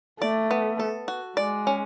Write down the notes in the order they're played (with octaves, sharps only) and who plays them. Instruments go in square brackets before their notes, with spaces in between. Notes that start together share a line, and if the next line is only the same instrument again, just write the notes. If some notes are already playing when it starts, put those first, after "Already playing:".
[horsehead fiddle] A3 [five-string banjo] D5
[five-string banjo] B3
A4
F#4
[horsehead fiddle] G#3 [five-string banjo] D5
[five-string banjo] C#4